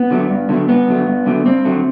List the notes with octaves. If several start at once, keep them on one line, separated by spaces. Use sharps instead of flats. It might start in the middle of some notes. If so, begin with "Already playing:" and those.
Already playing: B3
D3 F#3 A3
G2
D3 F#3 A3
G2 B3
D3 F#3 A3
G2
D3 F#3 A3
G2 C4
D3 F#3 A3